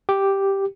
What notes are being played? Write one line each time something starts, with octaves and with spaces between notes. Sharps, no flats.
G4